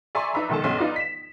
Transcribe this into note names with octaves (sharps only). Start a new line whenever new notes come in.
D5 E5 G#5 A#5 C6 C#6
D#4 B4 D5 E5 A#5 B5
B1 G#2 D#3 A4 A5
B1 G2 C#4 C6
D#4 F4 B4 D5 D#5
B6 E7